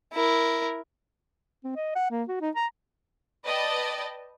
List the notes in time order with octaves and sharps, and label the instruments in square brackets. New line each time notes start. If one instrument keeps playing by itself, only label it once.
[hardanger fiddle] E4 A#4
[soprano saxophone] C4
D#5
F#5
A#3
F#4
D#4
A#5
[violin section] B4 D5 D#5 G5 A5 A6